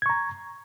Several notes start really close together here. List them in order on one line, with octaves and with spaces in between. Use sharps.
G#6 C#6 A#5